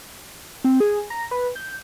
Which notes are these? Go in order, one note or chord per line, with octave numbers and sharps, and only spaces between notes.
C4
G#4
A#5
B4
G6